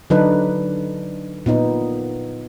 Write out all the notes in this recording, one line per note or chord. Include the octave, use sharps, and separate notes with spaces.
D3 F#3 D4 D#4 B4
A#2 B3 D#4